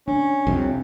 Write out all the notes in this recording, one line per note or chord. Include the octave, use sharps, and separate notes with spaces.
C#4 D4
C2 F2 C3